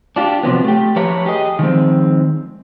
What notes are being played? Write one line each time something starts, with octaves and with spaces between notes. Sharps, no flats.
D4 F4 G4
C3 F3 F#3 B3
A3 G4
F3 A3 G4 B4 C#5 A#5
G4 G#4 D#5
D#3 F3 G#3 C4